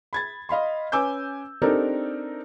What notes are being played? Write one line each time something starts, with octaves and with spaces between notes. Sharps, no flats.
B5 G#6 A6
D#5 F5 B5 C6
C#4 B4 G#5 D6 E6 G6
C4 D4 D#4 G4 A4 A#4